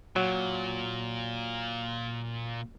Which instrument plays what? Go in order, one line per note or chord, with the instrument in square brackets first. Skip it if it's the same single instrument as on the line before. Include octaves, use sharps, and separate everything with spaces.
[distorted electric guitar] A#2 [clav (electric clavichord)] F#3